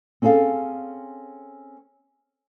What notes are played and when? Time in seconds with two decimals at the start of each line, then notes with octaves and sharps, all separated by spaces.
0.22 C4 C#4 G#4 A4 F5